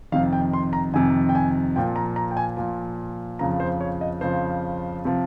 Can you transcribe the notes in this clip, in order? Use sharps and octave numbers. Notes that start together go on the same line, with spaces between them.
F2 C3 D#3 F5
G5
C6
A#5
F2 C3 D#3 G#5
G5
G#5
A#2 F3 G5
A#5
A#5
G5
G#5
A#2 F3
F2 C#3 F3 A#5
C5
C#5
D#5
F2 C#3 F3 C5
C3 F3